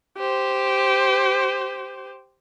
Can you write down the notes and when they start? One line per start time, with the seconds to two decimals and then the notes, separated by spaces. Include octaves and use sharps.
0.18 G4 C5